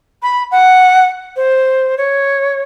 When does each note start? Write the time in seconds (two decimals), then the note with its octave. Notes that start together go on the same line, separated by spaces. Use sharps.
0.22 B5
0.51 F#5
1.36 C5
1.97 C#5